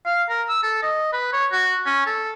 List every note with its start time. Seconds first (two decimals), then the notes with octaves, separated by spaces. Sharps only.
0.06 F5
0.30 A#4
0.48 E6
0.63 A4
0.83 D#5
1.13 B4
1.33 C#5
1.52 F#4
1.86 C#4
2.07 A4